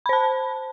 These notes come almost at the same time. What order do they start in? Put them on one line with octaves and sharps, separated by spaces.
B5 C5 A5